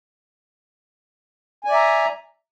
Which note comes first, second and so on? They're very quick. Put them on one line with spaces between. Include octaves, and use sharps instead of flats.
G#5 D5 E5 A#5